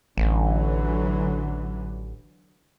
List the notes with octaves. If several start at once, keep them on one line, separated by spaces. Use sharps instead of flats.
A1 D3 E3 F#3